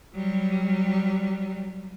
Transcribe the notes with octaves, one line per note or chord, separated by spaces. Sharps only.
F#3 G3